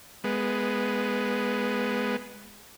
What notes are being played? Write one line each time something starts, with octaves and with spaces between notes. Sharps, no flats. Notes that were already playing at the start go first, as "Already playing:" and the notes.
G#3 B3